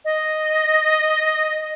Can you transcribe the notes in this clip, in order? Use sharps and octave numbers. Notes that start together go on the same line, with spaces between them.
D#5